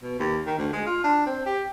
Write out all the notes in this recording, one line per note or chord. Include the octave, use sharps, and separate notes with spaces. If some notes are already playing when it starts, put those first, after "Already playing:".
B2
D#2
D#3
D2
G#3
F4
D4
C4
G4